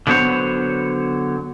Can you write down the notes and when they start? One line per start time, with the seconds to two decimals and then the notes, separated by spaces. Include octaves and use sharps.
0.07 D3 F#3 B3 C5 C#5